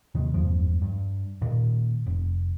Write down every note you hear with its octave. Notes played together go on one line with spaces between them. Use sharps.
D#2 G#2 C3 D#3
F#1 E2 G2 F3
G2
A#2 D#3
F1